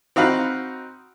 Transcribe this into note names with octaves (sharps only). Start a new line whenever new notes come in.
C4 D#4 F#4 F5 B5